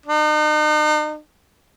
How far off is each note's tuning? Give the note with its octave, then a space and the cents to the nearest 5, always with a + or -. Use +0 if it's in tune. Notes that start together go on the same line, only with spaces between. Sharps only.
D#4 -40